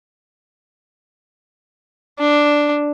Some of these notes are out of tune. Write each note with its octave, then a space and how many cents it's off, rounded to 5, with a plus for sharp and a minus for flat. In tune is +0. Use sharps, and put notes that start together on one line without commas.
D4 +0